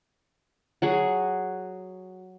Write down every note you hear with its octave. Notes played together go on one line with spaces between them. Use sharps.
F#3 F#4 G#4